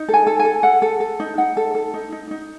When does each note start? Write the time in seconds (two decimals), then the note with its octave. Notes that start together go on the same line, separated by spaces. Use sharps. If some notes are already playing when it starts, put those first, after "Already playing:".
Already playing: D#4
0.09 A4 G#5
0.27 A4
0.39 G#5
0.45 A4
0.63 A4 F#5
0.82 A4
1.00 A4
1.20 D#4
1.38 D#4 F#5
1.57 A4
1.75 A4
1.94 D#4
2.12 D#4
2.31 D#4